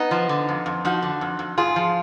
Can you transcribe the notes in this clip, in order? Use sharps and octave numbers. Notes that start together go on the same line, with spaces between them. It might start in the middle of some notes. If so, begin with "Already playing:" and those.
Already playing: B3 D#4
F3
D3
F2
F2
F3 D#4 F#4
D3
F2
F2
G#2 F4 G#4
F3